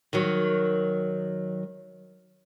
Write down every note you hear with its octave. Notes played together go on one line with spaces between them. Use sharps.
D#3 F#3